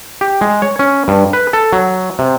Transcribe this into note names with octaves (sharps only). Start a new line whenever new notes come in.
G4
G#3
C#5
C#4
G2
B4
A4
F#3
C3